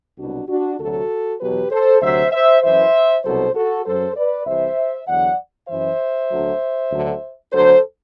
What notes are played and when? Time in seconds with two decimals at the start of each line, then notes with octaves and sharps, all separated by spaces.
0.18 C2 B2 F#3 D4 F#4
0.48 D4 F#4
0.79 D2 C3 F#3 F#4 A4
1.40 E2 B2 F#3 G4 B4
1.71 A4 C5
2.01 D2 C3 F#3 C5 E5
2.32 C5 E5
2.62 F#2 E3 C5 E5
3.24 C2 B2 F#3 A4 C5
3.54 F#4 A4
3.86 F#2 F#3 A4 C5
4.16 B4 D5
4.46 C2 C3 E3 C5 E5
5.08 E2 D3 F#3 D5 F#5
5.69 F#2 E3 C5 E5
6.29 D2 D3 F#3
6.91 D2 D3 F#3
7.52 D2 D3 F#3 A4 C5